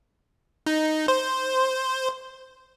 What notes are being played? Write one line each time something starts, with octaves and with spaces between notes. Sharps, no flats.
D#4
C5